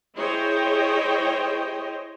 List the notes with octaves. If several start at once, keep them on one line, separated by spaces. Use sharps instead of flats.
E4 G#4 C5 C#5 D#5 G5